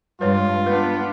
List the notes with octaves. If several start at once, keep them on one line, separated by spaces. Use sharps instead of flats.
G2 G#3 F4 B4 C#5
B3 D4 B4